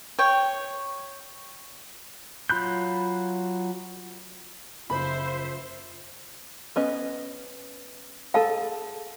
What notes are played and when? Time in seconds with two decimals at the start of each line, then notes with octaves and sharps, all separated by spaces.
0.19 C#5 G5
2.50 F#3 F4 B5 F#6 G6
4.90 F#1 F3 C5 E5 B5
6.76 B3 C#4 D#5
8.34 G#4 A4 F5 A5